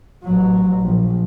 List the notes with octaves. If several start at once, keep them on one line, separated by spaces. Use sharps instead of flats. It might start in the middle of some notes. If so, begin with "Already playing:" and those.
A1 F#3
A#1